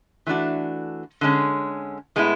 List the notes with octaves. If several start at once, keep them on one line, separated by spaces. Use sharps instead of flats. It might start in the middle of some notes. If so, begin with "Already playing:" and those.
E3 A3 D4 F#4
D3 G#3 C#4
A2 G#3 B3 E4